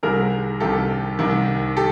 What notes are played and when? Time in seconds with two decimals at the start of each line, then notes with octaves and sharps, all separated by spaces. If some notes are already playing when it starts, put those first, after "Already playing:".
0.03 C2 C3 D#3 G#4 A#4
0.60 C2 C3 D#3 G4 A4
1.19 C2 C3 D#3
1.77 G4 A4